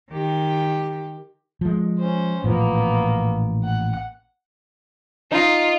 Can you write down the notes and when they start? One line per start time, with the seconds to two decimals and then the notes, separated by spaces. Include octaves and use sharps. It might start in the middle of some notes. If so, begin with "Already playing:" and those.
0.11 D#3 G4
1.61 F3 G#3
2.00 C#4 C5
2.44 A1 A#2 F3 A#3 B3
3.64 F#5
5.32 D#4 F4